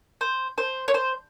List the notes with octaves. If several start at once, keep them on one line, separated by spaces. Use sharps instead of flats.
C5
C5
C#5
C5